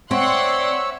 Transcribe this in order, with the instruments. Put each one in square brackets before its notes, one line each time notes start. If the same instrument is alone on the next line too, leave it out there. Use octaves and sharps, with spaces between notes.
[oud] C4 [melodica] C#5 E5 E6 [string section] D5 F#5 C6